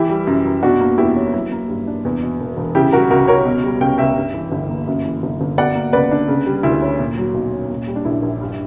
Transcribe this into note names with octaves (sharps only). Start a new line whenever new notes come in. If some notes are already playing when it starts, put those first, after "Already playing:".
Already playing: E3 E4 G4
G3
F#2
F#2
B2 D4 F#4
A#3
E2 E4 G4
C#4
F#3 E4
A#3
G2
D4
E2
B2
E1
E1
C#3 E4 G4
G3 F#4 A#4
C#2 F#4 A#4
C#2 A#4 C#5
B2
G3
C#2 G5
C#2 E5 G5
G2
E3
G1
A#3
F#2
E3
G1
G1
B2 D5 F#5
A#3
C#2 B4 D5
D4
C#3
G3
D2 E4
C#4
A#2
F#3
B1
C#4
A#2
G3
D4
A#1 E4
A#1
G2